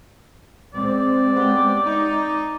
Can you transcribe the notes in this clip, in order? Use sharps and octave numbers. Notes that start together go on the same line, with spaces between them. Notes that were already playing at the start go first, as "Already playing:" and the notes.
G#3 C4 D5
B3 C#4 G4
D#4